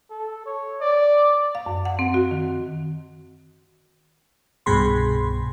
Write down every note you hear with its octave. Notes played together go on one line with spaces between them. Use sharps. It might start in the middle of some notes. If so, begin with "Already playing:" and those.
A4
C#5
D5
F5
F#2
F#5
C4
F#4
D#3
C2 G2 B2 G#4 B5 C6